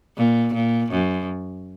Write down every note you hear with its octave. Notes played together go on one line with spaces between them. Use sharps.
A#2
A#2
F#2